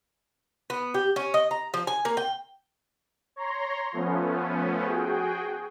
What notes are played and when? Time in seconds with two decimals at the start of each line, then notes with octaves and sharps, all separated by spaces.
0.70 B3
0.94 G4
1.16 C#4
1.34 D#5
1.51 A#5
1.74 F3
1.87 G#5
2.05 A#3
2.17 G5
3.36 C#5 A#5 C6
3.92 F3 A3 B3 C#4
4.85 F#4 G#4 G5